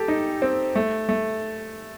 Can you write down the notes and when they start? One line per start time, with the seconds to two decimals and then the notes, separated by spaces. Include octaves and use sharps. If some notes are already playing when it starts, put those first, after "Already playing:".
Already playing: G4 A4
0.08 D#4
0.42 C4
0.76 A3
1.09 A3